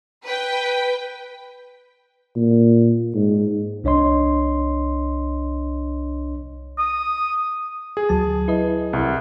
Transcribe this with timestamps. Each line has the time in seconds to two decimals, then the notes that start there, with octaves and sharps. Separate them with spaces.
0.25 B4 G5
2.36 A#2
3.14 G#2
3.84 C2 D4 C#5 D#5 C6
6.79 D#6
7.97 G#4
8.09 D2 F#3 A5
8.48 E4 B4 D#5
8.93 C2